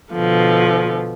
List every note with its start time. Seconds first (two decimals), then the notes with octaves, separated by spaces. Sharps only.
0.13 B2 D3 F3